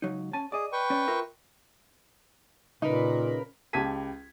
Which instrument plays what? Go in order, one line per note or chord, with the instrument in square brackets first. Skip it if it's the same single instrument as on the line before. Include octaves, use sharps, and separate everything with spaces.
[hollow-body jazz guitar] C#2 F#3 D#4
C#4 G#5 A5
[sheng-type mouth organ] G#4 [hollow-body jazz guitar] D5 D#5
[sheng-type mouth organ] B4 G5 C#6
[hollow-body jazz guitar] C#4 D5
F4 A#4 E5
[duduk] A#2 [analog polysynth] C#3 A#4 B5 [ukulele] D#4 [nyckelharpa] B4
[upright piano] C#2 G4 A5 G#6 B6 D#7